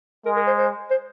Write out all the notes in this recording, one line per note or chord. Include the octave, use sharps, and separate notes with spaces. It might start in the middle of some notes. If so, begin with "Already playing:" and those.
G#3 A#4
A#4
C5
C5
C5